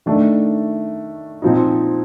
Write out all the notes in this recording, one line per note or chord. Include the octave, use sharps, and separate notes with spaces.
D#3 A3 D4
A#2 F3 C4 D#4